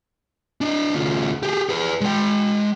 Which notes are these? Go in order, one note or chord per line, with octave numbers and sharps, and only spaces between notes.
D4 D#5
D2 F4
G4 G#4
G#4 B4
G#3 G5